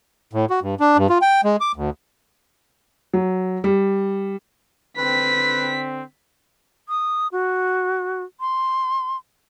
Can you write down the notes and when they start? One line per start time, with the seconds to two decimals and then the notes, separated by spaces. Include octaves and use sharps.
0.33 A2
0.50 F#4
0.62 G2
0.80 D4
0.97 G2
1.10 F4
1.21 G5
1.44 G#3
1.60 D6
1.76 D2
3.14 F#3
3.64 G3
4.98 D3 C4 B4 B6
6.88 D#6
7.32 F#4
8.40 C6